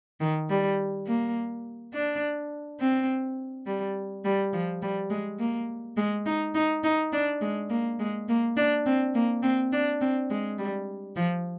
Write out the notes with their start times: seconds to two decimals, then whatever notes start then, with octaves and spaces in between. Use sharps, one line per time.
0.20 D#3
0.49 G3
1.07 A#3
1.94 D4
2.80 C4
3.66 G3
4.25 G3
4.53 F3
4.82 G3
5.10 G#3
5.39 A#3
5.97 G#3
6.26 D#4
6.55 D#4
6.84 D#4
7.12 D4
7.41 G#3
7.70 A#3
7.99 G#3
8.29 A#3
8.57 D4
8.86 C4
9.15 A#3
9.43 C4
9.72 D4
10.01 C4
10.30 G#3
10.58 G3
11.16 F3